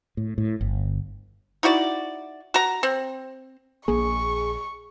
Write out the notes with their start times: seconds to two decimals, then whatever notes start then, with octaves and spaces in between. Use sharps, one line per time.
0.17 A2
0.38 A2
0.61 G1
1.63 D#4 E4 F#4 D5
2.54 F#4 A#5
2.83 C4
3.88 A#1 A#2 A#3 G#4 C#6